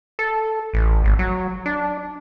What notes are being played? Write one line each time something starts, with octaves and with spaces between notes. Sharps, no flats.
A4
A1
G#1
F#3
D4